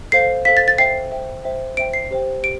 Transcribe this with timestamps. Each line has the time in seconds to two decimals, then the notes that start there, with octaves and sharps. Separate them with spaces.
0.12 A4 C5 F5 C7
0.45 A4 C5 F5 B6
0.57 A6
0.68 A6
0.78 C5 E5 G5 C7
1.11 C5 E5 G5
1.44 C5 E5 G5
1.77 C5 E5 G5 D7
1.93 C7
2.11 G4 C5 G5
2.43 G4 D7